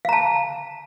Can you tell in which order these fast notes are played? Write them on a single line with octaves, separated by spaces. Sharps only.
F5 A#5 A5